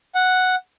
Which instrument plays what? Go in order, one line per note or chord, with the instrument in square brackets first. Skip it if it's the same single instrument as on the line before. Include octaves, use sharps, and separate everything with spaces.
[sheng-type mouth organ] F#5